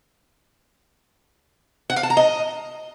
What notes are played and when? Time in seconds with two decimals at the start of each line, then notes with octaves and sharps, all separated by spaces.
1.90 F#5
1.96 F5
2.03 A5
2.10 A#5
2.17 D#5